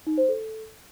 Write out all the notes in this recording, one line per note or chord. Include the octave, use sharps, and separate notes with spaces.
D#4
C5
A4